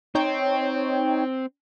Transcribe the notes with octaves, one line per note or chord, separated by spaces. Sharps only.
C4 D#4 C#5 G5